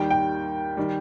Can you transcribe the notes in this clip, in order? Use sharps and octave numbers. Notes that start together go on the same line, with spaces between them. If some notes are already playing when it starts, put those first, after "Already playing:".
Already playing: D#2 D#3 G3 G5
G5
D#3 G3